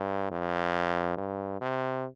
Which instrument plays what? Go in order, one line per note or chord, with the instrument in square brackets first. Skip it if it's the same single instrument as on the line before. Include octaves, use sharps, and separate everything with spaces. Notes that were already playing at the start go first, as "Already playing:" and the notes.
Already playing: [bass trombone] G2
F2
G2
C3